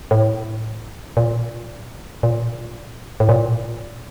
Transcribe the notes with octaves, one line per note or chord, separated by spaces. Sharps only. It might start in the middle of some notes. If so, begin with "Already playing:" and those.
A2
A#2
A#2
A2
A#2